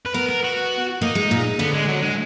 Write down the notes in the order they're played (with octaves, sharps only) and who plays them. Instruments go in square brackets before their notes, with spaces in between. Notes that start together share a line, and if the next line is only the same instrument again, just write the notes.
[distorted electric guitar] B4
[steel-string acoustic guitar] B3 [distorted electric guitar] A#4
[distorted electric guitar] A#4
F#4
[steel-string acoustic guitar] A#3 [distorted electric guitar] D#4
[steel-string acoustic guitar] G#3
A#2
[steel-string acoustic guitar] D3 [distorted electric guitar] B3
[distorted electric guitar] G#3
F#3
G#3